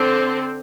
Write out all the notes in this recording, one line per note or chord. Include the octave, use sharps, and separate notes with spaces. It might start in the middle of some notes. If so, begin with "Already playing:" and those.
Already playing: D3 C4 A4 C5